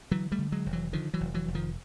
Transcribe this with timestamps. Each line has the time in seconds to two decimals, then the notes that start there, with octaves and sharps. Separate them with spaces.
0.11 D3 E3 F#3
0.32 G3 A3
0.38 D3
0.52 F#3 G#3
0.66 F1
0.73 E3 F#3
0.93 D3 D#3 F3
1.14 E3 F#3
1.21 F1
1.34 E3 F#3
1.48 F1
1.54 D#3 F3